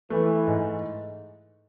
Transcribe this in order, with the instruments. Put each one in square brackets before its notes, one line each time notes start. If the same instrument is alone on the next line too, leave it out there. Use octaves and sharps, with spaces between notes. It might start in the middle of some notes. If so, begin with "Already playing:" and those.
[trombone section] E3 [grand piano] A3
[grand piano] G#2